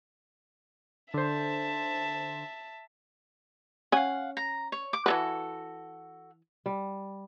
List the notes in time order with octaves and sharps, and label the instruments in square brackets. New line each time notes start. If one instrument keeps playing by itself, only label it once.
[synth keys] D3 C5 [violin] E5 A5
[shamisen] C#4 G#5 [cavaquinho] F5 F#5
[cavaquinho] A#5
C#5
D6
[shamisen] E3 A3 B4 [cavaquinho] F#4 A4
[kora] G3